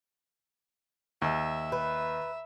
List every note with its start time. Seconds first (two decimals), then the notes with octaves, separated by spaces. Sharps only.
1.22 D#2 E5
1.72 B4